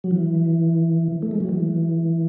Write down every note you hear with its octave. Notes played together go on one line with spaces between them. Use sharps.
F#3
E3
A3
G#3
F#3
E3